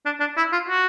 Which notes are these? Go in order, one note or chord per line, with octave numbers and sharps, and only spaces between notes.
D4
D4
E4
F4
F#4